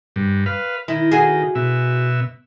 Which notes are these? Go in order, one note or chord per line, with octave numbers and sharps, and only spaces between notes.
G2
B4 F5
D#3 E4
F#4 G#4
B2 E5